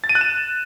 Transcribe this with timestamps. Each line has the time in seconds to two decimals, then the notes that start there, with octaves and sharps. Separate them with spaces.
0.04 A6
0.09 D#7
0.15 F#6
0.21 E7